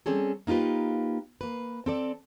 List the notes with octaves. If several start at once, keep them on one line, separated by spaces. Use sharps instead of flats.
G3 C4 C#4 G#4 A4
A#3 D#4 F4 G4 B4
A#3 B4
C4 A4 D5